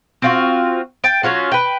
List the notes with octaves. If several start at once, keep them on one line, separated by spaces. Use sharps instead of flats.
C4 F4 F#4
G5 A5
F#3 C#4 F4 F#4
B4 G5